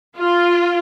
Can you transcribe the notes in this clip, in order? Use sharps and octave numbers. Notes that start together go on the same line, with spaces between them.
F4